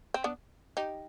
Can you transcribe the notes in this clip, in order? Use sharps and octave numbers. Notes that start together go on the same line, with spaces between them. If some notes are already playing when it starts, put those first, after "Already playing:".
C4
B3 D4
D#4 G4